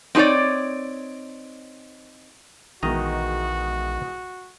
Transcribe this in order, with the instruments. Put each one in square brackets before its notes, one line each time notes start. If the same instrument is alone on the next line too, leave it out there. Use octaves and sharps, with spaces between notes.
[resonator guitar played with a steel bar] C4 D#4 G4 C#5 D5
[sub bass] A#1 [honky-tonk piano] B2 E3 G#3 [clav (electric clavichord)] D#3 D#5 A#5 [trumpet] F#4